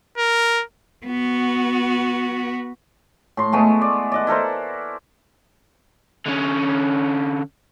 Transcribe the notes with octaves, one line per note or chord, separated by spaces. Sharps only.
A#4
B3 F#4
A2 C6
G#3 A3 B3
D5
D5 D#5 F#5
E4 A4 A#4 C5
D3 C#4